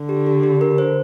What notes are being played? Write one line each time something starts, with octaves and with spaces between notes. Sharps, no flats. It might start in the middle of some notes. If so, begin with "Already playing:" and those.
Already playing: D3
G4
G4
G4
A#4
C5